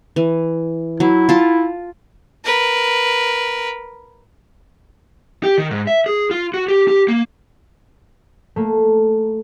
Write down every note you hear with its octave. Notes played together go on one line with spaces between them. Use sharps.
E3
F#3 E4
F4 A5
A#4 B4
G4
D#3
G#2
E5
G#4
F4
F#4
G4
G4
A#3
A3 A#3